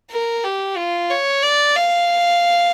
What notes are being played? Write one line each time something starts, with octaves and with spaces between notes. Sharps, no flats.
A#4
G4
F4
C#5
D5
F5